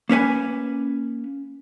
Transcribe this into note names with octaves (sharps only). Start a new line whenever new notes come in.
A#3 C#4 B4 G#5